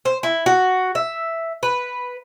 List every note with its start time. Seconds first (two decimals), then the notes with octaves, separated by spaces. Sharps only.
0.05 C5
0.23 E4
0.46 F#4
0.95 E5
1.63 B4